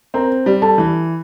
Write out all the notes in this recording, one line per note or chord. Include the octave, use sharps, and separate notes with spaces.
C4 A#4 A#5
G3
A4 A5
E3